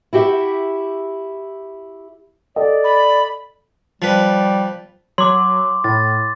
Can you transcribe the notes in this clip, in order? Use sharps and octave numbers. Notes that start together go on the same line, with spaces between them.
E4 F#4 G4 E5
A4 D5 D#5
B5
F3 G3 B4
F#3 C6 D6
A2 A6